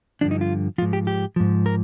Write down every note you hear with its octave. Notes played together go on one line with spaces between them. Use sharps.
G2 D3 F3 D4
D#4
F4
G#2 F3 F4
G4
G4
G#2 F3
A#4